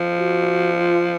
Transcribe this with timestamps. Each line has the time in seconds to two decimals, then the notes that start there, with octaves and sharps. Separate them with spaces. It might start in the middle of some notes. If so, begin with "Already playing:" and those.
Already playing: F3
0.18 F#4
0.78 F4